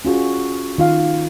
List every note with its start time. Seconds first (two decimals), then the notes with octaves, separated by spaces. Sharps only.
0.05 C#4 F4 F#4 G#4
0.78 D#3 F4 F5